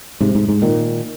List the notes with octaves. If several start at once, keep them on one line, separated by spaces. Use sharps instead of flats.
G#2 C3
G#2
G#2
A#2 D#3